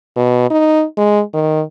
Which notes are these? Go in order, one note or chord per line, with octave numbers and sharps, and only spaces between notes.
B2
D#4
G#3
D#3